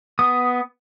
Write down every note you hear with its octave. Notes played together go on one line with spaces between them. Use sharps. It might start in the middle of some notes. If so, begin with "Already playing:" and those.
B3 D#6